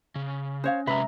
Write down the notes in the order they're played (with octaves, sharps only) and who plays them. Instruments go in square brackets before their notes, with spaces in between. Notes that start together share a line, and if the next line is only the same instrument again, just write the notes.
[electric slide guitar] C#3
[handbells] C#4 [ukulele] C5 C#5 F5
[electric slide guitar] C3 F#3 G#3 [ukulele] B4 [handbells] E5 A#5